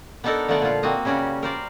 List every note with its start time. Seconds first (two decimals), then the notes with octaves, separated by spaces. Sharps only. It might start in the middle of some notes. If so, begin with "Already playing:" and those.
0.24 B3 D4 D#4 A4 A#4 F#5
0.48 D3 F3 A3 B3 D5 F#5
0.62 A#2 F4
0.83 A#3 C4 F#4 D#5
1.05 C#3 G3 C#4 F#4
1.43 A#4 C5 D5